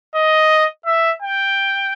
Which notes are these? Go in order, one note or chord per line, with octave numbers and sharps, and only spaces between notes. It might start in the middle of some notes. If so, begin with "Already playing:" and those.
D#5
E5
G5